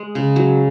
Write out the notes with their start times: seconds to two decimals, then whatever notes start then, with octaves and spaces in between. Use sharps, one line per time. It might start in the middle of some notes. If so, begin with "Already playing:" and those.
Already playing: G#3
0.15 C#3
0.36 F#3